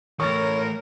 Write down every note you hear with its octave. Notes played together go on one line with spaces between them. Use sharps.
E3 A3 A#4 C#5 C#6 A6